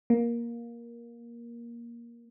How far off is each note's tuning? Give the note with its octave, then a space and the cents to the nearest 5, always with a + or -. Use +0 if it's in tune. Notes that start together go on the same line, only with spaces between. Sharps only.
A#3 +15